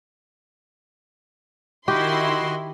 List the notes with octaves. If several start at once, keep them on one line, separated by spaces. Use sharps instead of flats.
D#3 E4 F#4 G4 D#5 C6